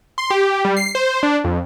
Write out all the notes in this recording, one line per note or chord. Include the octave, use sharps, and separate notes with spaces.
C6
G4
G3
C7
C5
D4
F2